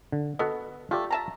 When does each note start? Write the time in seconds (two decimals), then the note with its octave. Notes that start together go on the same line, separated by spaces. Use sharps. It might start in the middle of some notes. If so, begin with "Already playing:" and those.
0.12 D3
0.39 B3 F#4 A4 D#5
0.91 A3 F4 G4 D5
1.10 E5 A5 A#5